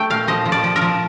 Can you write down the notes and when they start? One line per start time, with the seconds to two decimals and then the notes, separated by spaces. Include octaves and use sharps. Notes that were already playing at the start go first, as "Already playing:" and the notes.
Already playing: A3 G5
0.10 A#2 F5
0.28 F3 D#5
0.46 F3
0.52 D5
0.64 F3
0.76 A#4
0.81 F3